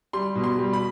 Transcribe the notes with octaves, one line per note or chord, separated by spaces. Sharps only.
G3 C6
B2
C6
G3
B5